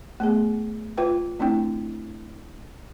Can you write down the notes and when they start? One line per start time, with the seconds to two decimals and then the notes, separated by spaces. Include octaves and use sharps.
0.20 A3 B3 G#4
0.97 F4 B4 G5
1.39 A3 C4 D4 E4 G5